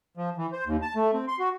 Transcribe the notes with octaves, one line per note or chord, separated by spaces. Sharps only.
F3
E3
C5
D#2
A5
A3
C4
C6
F#4